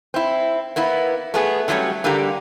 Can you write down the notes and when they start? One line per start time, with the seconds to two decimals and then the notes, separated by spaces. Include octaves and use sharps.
0.14 C4 E4
0.76 A#3 B3 E4
1.34 A3 B3 G#4
1.68 D3 F#3 G3 A3 C#4
2.04 D3 G3 A#3 G4 A#5